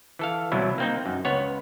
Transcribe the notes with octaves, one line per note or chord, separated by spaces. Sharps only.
E3 A4 F5
C2 B2 E3 F#3 E4
A#3 C4 D#4
F#2
C#2 B3 C#5